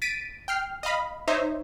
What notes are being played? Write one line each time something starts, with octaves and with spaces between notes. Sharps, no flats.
A6 B6 D7 D#7
G5 F6 C7
D#5 F5 B5
D#4 C5 C#5 E5